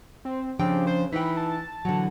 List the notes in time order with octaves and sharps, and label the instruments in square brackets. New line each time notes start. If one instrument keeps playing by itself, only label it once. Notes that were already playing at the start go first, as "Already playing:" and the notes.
[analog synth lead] C4
[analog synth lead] C#3 [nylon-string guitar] F3 D4 G5 [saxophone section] C4 G4
[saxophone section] C5
[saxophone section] E3 [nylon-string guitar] D#4 G5 [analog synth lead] B5
[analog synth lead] A5
[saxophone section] A#2 F#4 [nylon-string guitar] D3 E3 F#3